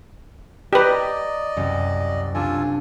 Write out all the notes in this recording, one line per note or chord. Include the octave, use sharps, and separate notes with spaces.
G4 B4 D5 D#5 A#5
C2 F#2 G3
C2 D4 F4 A4 G#5